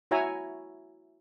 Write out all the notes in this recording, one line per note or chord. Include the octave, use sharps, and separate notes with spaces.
E4 F#4 C#5 E5 G#5 A#5